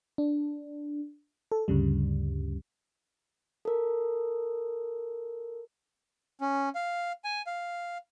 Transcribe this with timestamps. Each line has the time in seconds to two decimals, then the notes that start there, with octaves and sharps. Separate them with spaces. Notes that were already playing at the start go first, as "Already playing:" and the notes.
0.18 D4
1.52 A4
1.68 D2 G2 C#3 G3
3.65 A4 A#4
6.41 C#4
6.75 F5
7.24 G#5
7.47 F5